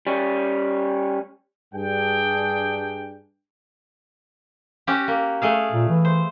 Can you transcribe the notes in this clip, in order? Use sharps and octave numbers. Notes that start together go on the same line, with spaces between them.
G3 C#4
G2 D4 G#4 G5
C#4 F#4 G4
A#3
A3 G#4 F5
A#2
E3
C5